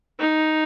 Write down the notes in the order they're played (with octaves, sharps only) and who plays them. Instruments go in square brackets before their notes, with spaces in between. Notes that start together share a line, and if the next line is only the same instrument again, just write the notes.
[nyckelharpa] D#4